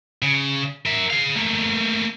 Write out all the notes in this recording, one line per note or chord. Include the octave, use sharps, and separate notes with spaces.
C#3
A#4 E5
G#4 F5
A3 A#3